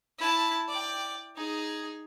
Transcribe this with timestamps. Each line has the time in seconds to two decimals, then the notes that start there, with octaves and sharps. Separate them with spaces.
0.18 E4 A5
0.68 D5 G5
1.36 D#4 G#4